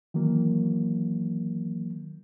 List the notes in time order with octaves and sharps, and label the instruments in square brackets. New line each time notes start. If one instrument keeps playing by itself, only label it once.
[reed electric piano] D#3 E3 F#3 A#3